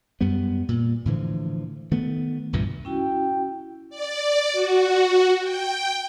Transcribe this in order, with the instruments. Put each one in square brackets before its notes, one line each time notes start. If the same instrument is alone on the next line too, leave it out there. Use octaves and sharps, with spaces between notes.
[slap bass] F#2 G3 B3
A#2
A2 D3 E3 F3
D#3 A3 B3
C2 G2 A#2 E3
[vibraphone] C#4 E4 F#4 [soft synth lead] G5
[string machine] D5
F#4
G5